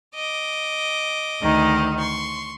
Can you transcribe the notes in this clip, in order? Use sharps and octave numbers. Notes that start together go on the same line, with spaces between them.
D#5 D6
D2 D#3 D#4
C6 C#6